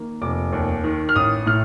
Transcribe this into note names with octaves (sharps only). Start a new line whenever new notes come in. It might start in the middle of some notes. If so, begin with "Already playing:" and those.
Already playing: D#3 A#3
F1 D6
D#2
D#3
F6
A1 D#6
A2 F6